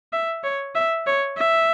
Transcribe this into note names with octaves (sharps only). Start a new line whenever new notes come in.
E5
C#5
E5
C#5
E5